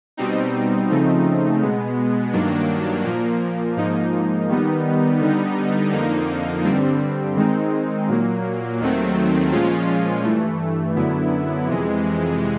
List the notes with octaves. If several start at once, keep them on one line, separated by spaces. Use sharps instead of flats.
B2 G3 C4 D#4
C#3 F3 A3 C4 D#4
B2 G#3 B3
G2 D#3 F#3 A#3 D4
A#2 F3 A#3
G#2 F3 A#3 D#4
D#3 G3 B3 D#4
D3 G3 B3 D#4
F2 D3 F3 A#3 D#4
G2 D3 G3 C4
D#3 G#3 C4 D#4
A#2 F#3 A#3
D#2 D#3 F#3 A3 C4
A#2 F3 G#3 C#4 F4
G2 E3 A3
F#2 D3 F#3 B3 E4
F2 C3 E3 G#3